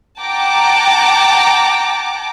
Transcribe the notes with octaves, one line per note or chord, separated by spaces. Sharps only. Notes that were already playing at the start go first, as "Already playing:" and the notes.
F#5 G5 A5 A#5 D6